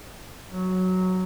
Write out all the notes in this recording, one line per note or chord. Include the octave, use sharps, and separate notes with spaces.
F#3